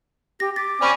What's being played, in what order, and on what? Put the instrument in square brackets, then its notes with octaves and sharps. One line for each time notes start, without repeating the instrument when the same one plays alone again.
[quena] G4 [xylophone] A#6
[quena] D6 [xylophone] A6 B6
[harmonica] C4 C#4 G#5 [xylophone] D5 B5 C#6